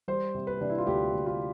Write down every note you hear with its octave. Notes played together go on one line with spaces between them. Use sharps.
G3 C5
C3
B4
C3 D4
E4
F4
D2 G4
D2
F4